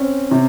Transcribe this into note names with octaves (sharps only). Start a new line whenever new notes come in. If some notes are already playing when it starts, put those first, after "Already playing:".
Already playing: C4 C#4
C3